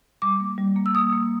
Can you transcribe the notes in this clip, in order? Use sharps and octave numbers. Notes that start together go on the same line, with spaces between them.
G3 D6
A#3
G3
A#3
E6
A#3 D#6
A#3